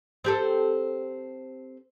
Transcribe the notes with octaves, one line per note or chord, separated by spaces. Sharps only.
C4 G4 A4